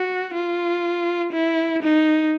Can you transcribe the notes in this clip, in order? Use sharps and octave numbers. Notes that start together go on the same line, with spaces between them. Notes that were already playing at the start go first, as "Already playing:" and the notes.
Already playing: F#4
F4
E4
D#4